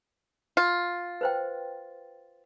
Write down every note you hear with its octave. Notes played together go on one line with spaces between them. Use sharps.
F4
B4 C5 G5